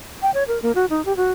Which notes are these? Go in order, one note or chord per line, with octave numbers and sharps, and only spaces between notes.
G5
C#5
A#4
A#3
F#4
D#4
G4
F#4